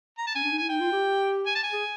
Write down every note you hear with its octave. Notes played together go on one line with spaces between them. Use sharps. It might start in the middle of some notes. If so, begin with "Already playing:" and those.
A#5
A5
C#4 G#5
D4
D#4
E4 G#5
D#4 G5
F4
G4
G#5
A5
G#5
G#4